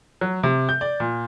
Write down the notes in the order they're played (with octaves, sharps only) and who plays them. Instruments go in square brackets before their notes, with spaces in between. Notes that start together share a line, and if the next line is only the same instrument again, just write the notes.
[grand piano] F#3
C3
G6
D5
A#2